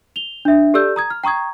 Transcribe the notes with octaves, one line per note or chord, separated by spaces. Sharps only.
F7 G7
D4 E5
G4 A4 D5 E6 G6
A#5 D#6 G#6
F6
G5 A#5 C#6 D#6 G#6